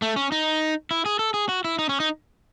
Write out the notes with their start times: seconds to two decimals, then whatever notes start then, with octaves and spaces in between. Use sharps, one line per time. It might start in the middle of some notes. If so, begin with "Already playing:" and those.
0.02 A3
0.16 C#4
0.32 D#4
0.91 E4
1.06 G#4
1.19 A4
1.34 G#4
1.49 F#4
1.64 E4
1.79 D#4
1.89 C#4
2.00 D#4